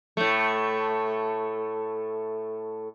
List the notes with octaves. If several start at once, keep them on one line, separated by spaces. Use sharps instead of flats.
A2 A3